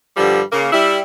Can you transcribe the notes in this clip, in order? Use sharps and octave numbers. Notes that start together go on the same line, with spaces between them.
G2 D3 F3 G3
C#3 A#3
G3 E4